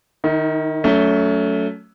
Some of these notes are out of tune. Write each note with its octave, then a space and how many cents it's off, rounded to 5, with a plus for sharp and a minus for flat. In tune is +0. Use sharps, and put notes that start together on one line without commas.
D#3 -10 D#4 +40
F#3 +0 A3 +0 C#4 +30